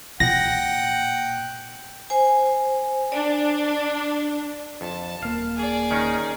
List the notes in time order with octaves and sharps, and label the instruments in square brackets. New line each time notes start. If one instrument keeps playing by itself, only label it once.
[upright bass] A#2 [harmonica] F#5 G5 [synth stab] A#6
[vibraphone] C5 G#5
[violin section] D4 [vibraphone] D5
[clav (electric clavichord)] F2 [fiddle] A5
[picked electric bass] D#1 A#3 [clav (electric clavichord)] F5
[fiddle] G#4 D5
[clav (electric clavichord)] D#3 C#4 D#4